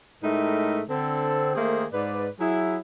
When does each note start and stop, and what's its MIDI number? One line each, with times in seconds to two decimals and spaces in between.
0.23 0.82 45
0.23 0.82 56
0.23 0.82 57
0.23 0.82 63
0.23 0.82 70
0.90 1.53 50
0.90 1.53 60
0.90 1.53 69
1.55 1.85 51
1.55 1.85 57
1.55 1.85 58
1.55 1.85 68
1.55 1.85 72
1.55 1.85 76
1.93 2.28 44
1.93 2.28 71
1.93 2.28 74
2.40 2.77 54
2.40 2.77 64
2.40 2.77 68